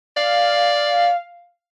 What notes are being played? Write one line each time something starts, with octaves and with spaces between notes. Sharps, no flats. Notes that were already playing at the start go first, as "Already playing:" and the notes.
D5 F5